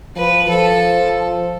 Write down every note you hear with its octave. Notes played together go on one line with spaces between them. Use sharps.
F3 B4
F3 A4